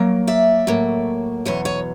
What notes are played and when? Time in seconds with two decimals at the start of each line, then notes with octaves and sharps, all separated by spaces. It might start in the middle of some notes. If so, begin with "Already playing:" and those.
Already playing: F#3 A#3
0.27 D5 E5
0.67 A2 F#3 A#3
1.45 E2 B2 F#3 C#5 D#5
1.65 C#5 D#5